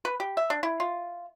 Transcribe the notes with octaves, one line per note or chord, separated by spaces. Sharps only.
B4
G4
E5
D4
E4
F4